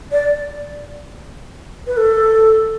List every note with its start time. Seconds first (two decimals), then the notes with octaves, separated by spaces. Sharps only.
0.12 D5
1.87 B4
1.97 A4